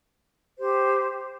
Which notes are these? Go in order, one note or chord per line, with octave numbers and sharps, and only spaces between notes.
G4 C5